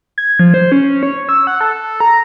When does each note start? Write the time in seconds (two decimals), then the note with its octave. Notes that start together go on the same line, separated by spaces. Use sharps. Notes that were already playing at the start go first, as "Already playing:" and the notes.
0.18 G#6
0.39 F3
0.54 C5
0.72 C#4
1.03 C#5
1.29 E6
1.47 F#5
1.61 A4
2.00 A#5